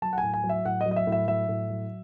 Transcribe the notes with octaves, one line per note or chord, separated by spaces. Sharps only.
F#3 A5
F#5
A2 G#5
G#5
F#3
E5
A2 F#5
D#5
F#3
D#5
E5
A2
E5
F#3 E5
A2
F#3